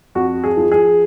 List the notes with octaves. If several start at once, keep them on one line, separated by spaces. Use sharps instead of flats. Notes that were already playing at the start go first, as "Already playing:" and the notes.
F2 F#4
G#4
F3
G#4